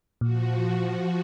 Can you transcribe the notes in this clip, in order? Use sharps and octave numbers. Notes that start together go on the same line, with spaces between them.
A#2 F3 F#4